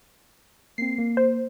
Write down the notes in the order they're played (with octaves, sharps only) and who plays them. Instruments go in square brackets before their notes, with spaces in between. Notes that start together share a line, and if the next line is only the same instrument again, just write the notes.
[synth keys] A#3 C4 [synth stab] C7
[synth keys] A#3
[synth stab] C5